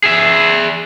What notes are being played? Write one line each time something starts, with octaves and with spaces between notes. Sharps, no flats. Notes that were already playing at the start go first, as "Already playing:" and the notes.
G#4 E5